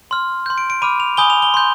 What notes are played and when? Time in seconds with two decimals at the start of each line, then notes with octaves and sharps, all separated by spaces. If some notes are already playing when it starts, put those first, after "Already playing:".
0.11 C6 F6
0.46 G6
0.50 C6
0.58 D7
0.70 D7
0.82 B5 D6 F6 D#7
1.00 F7
1.17 G#5 B5 D#6 G6 G7
1.30 F7
1.42 G7
1.54 C6 G6